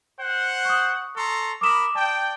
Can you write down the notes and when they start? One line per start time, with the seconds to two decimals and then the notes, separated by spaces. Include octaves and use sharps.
0.20 C5 F#5
0.65 C#6 D#6
1.16 A4 A#5 C6 C#6
1.61 A#4 B5 D6 D#6 E7
1.95 D5 G5 A5